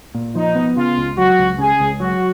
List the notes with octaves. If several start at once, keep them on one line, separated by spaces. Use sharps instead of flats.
A#2
F3 D#4
B3
C#3 F4
C#2
F#3 F#4
C#2
C#3 G#4
C#2
F#3 F#4